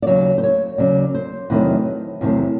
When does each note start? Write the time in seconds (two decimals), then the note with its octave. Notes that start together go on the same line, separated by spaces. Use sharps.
0.02 D5
0.07 D#2 C#3 F#3 C#5
0.38 C5
0.43 C#5
0.78 D#2 C#3 F#3 D5
1.14 C5
1.50 E2 C3 D#3 F#3 A3 B4
2.21 E2 C3 D#3 F#3 A3